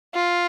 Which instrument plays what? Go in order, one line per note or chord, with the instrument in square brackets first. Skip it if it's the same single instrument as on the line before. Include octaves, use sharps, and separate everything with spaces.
[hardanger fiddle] F4